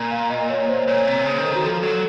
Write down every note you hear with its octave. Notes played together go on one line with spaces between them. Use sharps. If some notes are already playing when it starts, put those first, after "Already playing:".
Already playing: A#2
F5
D#5
C#5
C5
A#2 C#5
C3 C#5
C#3 C5
D#3
A4
D#3 F#4
F3 A4
F#3 A4